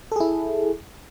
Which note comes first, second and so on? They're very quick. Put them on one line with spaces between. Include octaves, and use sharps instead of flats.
A4 G#4 E4